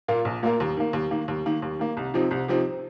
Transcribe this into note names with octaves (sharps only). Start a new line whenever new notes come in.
A#2 A#3 F4 A#4
A#1
A#2 A#3 F4 A#4
D#2
D#3 A#3
D#2
D#3 A#3
D#2
D#3 A#3
D#2
D#3 A#3
C2
C3 F3 C4 D#4
C2
C3 F3 C4 D#4